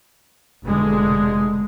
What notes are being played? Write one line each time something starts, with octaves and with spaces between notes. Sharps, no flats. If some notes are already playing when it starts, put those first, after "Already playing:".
F1 B2 D3 G#3